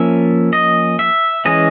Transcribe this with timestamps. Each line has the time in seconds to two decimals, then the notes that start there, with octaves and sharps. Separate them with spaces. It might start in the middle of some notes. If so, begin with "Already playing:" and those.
Already playing: F3 A#3 C#4 E5
0.53 D#5
0.99 E5
1.45 E3 G#3 C#4 D#5